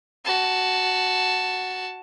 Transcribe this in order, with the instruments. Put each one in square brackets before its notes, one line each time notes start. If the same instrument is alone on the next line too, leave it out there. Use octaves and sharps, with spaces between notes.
[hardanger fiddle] F#4 A5